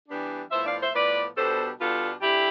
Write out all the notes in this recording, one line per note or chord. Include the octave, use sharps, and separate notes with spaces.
E3 G3 B3 D4
A2 F3 B3 C5 E5
D5 F5
C5 E5
A2 F3 B3 B4 D5
B2 G3 B3 D4 A4 C5
B2 G3 B3 D4 F4 A4
E3 A3 D4 E4 G4